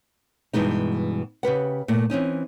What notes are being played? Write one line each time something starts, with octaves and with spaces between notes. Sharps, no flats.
G2 B2 E3 G#3 D#4
C#3 G4 B4 F#5
A#2 A3
E3 C4 C#4 D#4